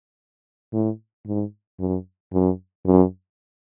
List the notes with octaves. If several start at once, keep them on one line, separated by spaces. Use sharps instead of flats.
A2
G#2
F#2
F#2
F#2